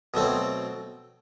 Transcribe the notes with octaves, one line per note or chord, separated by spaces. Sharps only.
B2 F#3 A3 C4